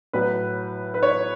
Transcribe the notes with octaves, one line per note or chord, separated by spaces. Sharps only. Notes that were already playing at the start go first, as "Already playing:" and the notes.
A2 F#3 B4
B4
C#5